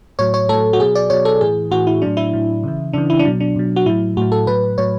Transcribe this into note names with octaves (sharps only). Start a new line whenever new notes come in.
A2 F#3 C#5
C#5
A2 F#3 A4
F#4
B2 F#3 G#4
D5
B2 F#3 C#5
A4
A2 E3 G#4
A2 E3 F#4
E4
A2 F#3 D4
E4
A2 F#3
C#3 E3
C#3 E3 D4
E4
D4
B2 F#3
D4
B2 F#3
F#4
A2 F#3 E4
A2 F#3 F#4
A4
A2 F#3 B4
A2 F#3 C#5